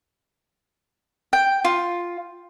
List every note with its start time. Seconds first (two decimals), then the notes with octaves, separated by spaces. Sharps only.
1.33 G5
1.64 F4